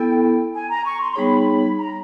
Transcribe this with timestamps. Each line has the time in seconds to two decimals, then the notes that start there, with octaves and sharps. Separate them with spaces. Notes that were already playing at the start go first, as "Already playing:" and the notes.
Already playing: B3 E4 A4 G5
0.54 G#5
0.69 A#5
0.85 C#6
1.00 C6
1.11 C6
1.16 G3 B3 D#4 G#4 C#5 B5
1.77 A#5